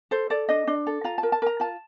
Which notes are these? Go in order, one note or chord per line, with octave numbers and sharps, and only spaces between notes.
A4 C5
A4 D5
D4 D#5
D4
A4
F4 A#5
A5
A#4
A5
A#4 A#5
F4 A5